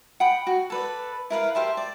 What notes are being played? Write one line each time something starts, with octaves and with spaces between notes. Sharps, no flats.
F#5 G5 B5 D#6
F#4
A4 B4 D5
E4 A#4 B4 F5
G4 C5 E5 A5
D5